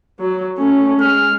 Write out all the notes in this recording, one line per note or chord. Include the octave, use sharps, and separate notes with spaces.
F#3
A3 C#4
G#3 F6